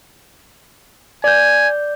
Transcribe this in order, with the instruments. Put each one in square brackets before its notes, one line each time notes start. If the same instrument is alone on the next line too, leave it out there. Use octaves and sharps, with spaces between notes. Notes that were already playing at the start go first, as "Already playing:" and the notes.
[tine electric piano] D5 G6 [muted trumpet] G#5